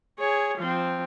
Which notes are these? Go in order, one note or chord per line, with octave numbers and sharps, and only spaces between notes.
G#4 C#5
F3 C4